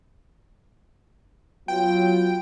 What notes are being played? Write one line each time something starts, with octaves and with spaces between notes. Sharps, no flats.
F#3 B3 F4 G5